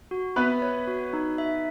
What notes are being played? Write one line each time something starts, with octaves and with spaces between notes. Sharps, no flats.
F#4
B3 B4 E5
C#5
F#4
D#4
E5